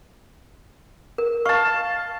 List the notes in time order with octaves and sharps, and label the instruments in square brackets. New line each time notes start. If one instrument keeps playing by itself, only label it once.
[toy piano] A#4
[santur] F5 A5 [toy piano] C#6